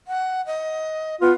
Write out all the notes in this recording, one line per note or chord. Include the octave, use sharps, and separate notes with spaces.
F#5
D#5
B3 F4